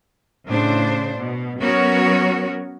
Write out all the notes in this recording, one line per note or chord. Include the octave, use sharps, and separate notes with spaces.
A2 C#3 D4 C5
B2
F#3 B3 C#4 F#4 A#4 C#5